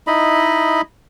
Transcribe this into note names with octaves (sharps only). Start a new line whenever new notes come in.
D#4 E4 D#5 B5